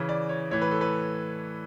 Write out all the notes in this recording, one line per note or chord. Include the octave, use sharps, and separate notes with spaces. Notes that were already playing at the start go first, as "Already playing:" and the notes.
Already playing: C#3 E3
D5
C#5
A2 E3 C#5
B4
A4
B4